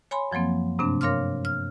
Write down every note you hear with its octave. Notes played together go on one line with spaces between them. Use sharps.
C#5 G#5 B5 C6
F#2 F3 F#3 A#3 C4
G2 C3 A3 C4 D4
A#4 C#5 F5 C6 D6 F6
F6